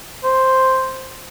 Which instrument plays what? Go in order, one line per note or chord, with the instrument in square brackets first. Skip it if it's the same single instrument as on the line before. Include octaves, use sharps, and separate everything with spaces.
[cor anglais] C5